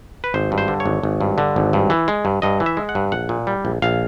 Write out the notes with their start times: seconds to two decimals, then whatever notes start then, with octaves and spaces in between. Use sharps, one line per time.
0.24 B4
0.34 G#1 C5
0.52 G2
0.58 C5
0.68 D3
0.80 C#5
0.86 G#1
1.03 G#1
1.21 G2
1.38 D3
1.56 G#1
1.73 G2
1.90 E3
2.08 G#3
2.25 G2
2.42 G2 D#5
2.60 E3
2.66 E5
2.77 G#3
2.89 F#5
2.95 G2
3.12 A#1 F#5
3.29 A#2
3.47 G3
3.65 A#1
3.82 A#1 F5